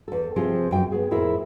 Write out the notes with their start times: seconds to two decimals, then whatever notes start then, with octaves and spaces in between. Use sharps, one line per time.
0.08 E2 A4
0.36 C3 F3 C4 G4 G#4
0.71 F#2 G5
0.92 B3 G#4
1.11 F2 A2 E4 G#4 A#4 E5